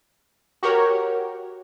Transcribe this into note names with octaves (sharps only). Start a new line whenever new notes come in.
F#4 G4 A#4 C#5